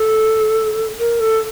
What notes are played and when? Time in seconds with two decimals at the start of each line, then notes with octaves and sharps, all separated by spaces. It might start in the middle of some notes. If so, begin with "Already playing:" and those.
Already playing: A4
0.99 A#4
1.20 A4